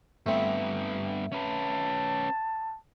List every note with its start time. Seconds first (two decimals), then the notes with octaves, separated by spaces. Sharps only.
0.26 G2 A3 B3 C4
1.32 C#4 B4 A5